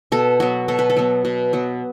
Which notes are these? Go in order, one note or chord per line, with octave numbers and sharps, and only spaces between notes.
B2 A4
F#3 B3 F#4
B2 A4
B4
A4
F#3 B3
B2
F#3 B3